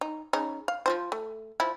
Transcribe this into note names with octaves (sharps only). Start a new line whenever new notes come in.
D#4
C#3 D#4
F5
F3 F4 C5
A3
F3 E4